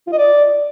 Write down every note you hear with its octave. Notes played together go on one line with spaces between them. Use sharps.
F4
D#5
D5